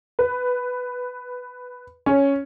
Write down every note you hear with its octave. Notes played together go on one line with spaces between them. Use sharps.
B4
C#4